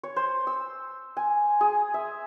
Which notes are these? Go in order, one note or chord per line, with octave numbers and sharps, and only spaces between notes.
C#5
C5
E6
G#5
G#4
E5